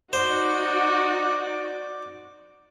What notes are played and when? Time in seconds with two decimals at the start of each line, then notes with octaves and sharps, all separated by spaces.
0.13 D#4 F#4 C5 D5 D6